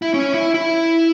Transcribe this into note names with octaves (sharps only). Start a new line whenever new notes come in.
E4
C#4
E4
E4